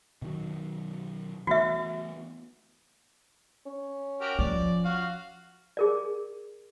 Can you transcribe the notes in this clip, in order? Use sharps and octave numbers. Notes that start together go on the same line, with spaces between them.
B2 D#3 F#3
E3 A3 B3 F#4 E5
C#4
F#4 G4 A#4
F3 D5
F4 F#4 F5
G#4 A#4 D5